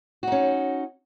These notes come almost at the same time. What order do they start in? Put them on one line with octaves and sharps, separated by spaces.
F#4 D#4 C#4